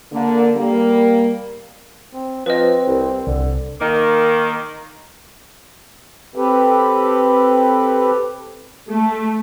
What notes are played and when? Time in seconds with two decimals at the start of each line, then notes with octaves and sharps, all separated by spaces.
0.12 D3 A#3
0.56 G3 A#3
2.13 C4
2.46 F3 C4 B4 D#5
2.87 C2
3.27 C2 D3
3.81 D#3 A#3
6.35 C4 G4 A4 B4
8.89 A3